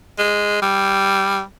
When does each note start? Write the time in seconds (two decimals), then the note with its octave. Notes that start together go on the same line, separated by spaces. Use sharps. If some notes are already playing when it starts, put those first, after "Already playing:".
0.18 G#3
0.62 G3